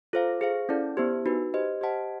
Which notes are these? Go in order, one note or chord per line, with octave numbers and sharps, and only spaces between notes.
F4 A4 C5 F5
G#4 C5 F5
C#4 E4 A4 D5
B3 E4 G4 C5
D#4 F#4 B4
G4 C5 D#5
G4 C5 D#5 F#5 A5